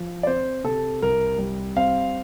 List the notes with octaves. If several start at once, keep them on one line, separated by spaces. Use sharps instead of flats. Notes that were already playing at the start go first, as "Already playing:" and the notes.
Already playing: F3
D5
C4 C5
C3 A4
C2 A#4
G3
C4 F5